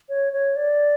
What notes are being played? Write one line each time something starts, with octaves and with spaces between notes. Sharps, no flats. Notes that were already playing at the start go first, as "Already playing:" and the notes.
C#5
C#5
D5